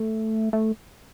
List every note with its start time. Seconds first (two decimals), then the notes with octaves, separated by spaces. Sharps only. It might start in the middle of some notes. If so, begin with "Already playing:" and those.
Already playing: A3
0.53 A3